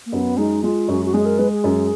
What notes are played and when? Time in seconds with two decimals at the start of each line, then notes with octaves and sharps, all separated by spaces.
0.06 A#3
0.12 F#2 B3
0.37 G#3 D#4
0.64 G#3 F4
0.88 F#2 F#4
1.05 F#4
1.14 G#3 G#4
1.26 A#4
1.38 G#3 B4
1.51 G#4
1.64 F#2